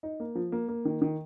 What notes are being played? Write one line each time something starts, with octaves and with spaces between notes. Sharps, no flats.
D#4
A#3
F3
A#3
A#3
D#3
D#3